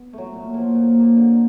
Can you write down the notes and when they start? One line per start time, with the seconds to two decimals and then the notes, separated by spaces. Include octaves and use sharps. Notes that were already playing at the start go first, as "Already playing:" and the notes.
Already playing: B3
0.13 F#3 A3
0.34 A#2
0.54 F3 A#3
0.75 A#2
0.95 F3 A#3
1.17 D3